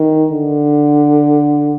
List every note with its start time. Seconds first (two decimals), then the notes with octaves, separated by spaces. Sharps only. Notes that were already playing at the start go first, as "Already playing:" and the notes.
Already playing: D#3
0.32 D3